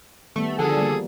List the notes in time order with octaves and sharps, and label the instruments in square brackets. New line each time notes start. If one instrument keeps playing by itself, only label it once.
[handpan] D#3 G3 B3 [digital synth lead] A3
[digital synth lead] D3 [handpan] F3 [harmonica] G#4 A4 G#5
[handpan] G3 A#3